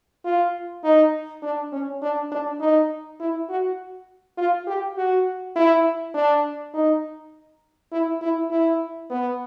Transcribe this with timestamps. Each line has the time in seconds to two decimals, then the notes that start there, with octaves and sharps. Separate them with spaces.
0.25 F4
0.84 D#4
1.43 D4
1.72 C#4
2.02 D4
2.32 D4
2.60 D#4
3.20 E4
3.49 F#4
4.38 F4
4.67 G4
4.97 F#4
5.56 E4
6.14 D4
6.74 D#4
7.92 E4
8.21 E4
8.51 E4
9.10 B3